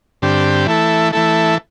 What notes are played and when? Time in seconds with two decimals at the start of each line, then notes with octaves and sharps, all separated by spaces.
0.22 G2 D3 C4 G4
0.66 E3 A3 E4 A4
1.12 E3 A3 E4 A4